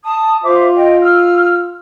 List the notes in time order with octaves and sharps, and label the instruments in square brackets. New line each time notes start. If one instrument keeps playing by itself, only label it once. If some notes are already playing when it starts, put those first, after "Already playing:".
[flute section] A5 D#6
[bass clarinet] F4 [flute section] C5 E5 D6
[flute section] D#5 G5
E6 F6